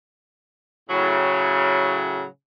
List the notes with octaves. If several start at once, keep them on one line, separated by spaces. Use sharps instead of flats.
A2 C#3 F#3